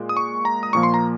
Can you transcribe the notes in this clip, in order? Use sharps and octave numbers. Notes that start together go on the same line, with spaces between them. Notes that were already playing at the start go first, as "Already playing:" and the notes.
Already playing: A#2 G#3
D#6
C#6
A#5
D#6
A#2 F3 A#3 C#6
C6
A#5